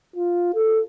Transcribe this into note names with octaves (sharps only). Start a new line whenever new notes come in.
F4
A4